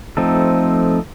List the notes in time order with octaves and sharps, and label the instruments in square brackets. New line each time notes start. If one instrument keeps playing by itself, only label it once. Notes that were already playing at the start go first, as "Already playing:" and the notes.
[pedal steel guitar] F3 A3 C4 D#4 A4